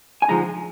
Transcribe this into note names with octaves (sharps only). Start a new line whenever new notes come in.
G#5
D2 D3 F3 G#3 D#4 A#5